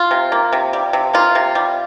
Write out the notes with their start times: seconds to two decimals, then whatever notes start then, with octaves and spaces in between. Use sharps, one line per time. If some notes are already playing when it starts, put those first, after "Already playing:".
Already playing: F4
0.11 C3
0.32 A#3
0.52 C3
0.73 G3
0.93 C3
1.13 A#3 F4
1.35 C3
1.55 G3